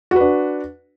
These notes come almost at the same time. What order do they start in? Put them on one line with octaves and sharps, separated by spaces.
F#4 B4 D4